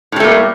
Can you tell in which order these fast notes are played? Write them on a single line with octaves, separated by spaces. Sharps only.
A2 G3 A3 A#3